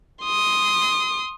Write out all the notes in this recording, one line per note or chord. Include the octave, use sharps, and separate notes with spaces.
C6 D#6